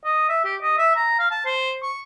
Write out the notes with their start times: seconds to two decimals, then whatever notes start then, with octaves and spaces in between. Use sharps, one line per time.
0.05 D#5
0.29 E5
0.44 G4
0.62 D#5
0.78 E5
0.96 A#5
1.19 F5
1.31 A5
1.46 C5
1.83 C#6